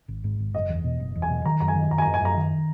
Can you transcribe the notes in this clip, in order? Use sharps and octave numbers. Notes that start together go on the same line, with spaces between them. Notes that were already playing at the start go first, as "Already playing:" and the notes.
G#1
G#2
G#1
F#1 D#5
E2
B2
F#1
E2
G#5
B2
D#3 A#5
F#2 A#5
G#5
D#3
F#2 A#5
G#5
F#2 A#5
G#5
F#2 A#5
D#3